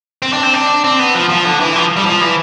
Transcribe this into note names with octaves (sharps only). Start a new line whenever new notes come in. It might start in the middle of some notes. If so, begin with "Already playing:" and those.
C4
D4
C4
D4
C4
B3
F3
F3
D3
E3
F3
G3
F3
E3